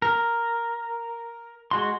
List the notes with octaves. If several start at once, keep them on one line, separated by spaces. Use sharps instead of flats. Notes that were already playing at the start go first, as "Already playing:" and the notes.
A#4
G#3 F#4 C6